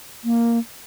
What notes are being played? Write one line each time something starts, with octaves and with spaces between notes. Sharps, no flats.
A#3